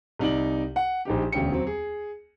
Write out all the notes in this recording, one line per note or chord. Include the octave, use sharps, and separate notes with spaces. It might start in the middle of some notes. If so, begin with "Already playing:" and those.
C2 D#4 D5 F#7
F#5
A#1 D#4 G4
E1 D2 C#4 G5 C#7
F#3 C4
G#4